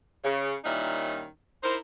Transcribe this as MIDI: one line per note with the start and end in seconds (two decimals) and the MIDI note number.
0.24 0.55 49
0.65 1.27 46
0.65 1.27 51
0.65 1.27 55
0.65 1.27 61
0.65 1.27 63
0.65 1.27 64
1.63 1.76 63
1.63 1.76 64
1.63 1.76 70
1.63 1.76 72